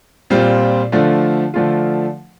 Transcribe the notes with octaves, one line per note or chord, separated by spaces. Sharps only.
A#2 G3 C4 F4
D3 F3 A3 D4 F4
D3 F3 A3 D4 F4